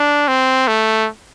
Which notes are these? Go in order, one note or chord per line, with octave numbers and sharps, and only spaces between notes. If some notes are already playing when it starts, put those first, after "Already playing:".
Already playing: D4
C4
A3